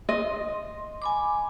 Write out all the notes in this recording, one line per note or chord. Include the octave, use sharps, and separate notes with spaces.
D#5 C6
G#5 B5 D6